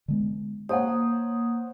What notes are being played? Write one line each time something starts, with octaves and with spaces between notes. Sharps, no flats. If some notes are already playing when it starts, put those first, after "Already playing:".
D3 G#3 B3
A#3 C5 C#5 F#5 D#6